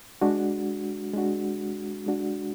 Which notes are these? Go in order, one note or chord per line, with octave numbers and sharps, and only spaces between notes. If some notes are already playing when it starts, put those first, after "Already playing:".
G#3 D4 F#4
G#3 D4 F#4
G#3 D4 F#4